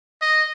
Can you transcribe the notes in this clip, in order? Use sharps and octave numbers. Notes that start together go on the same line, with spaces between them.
D#5